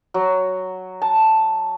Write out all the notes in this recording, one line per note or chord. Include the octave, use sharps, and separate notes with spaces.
F#3
A5